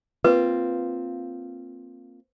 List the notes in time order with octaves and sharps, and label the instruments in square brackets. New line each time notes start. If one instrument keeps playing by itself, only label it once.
[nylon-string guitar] A#3 C4 F4 [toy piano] B4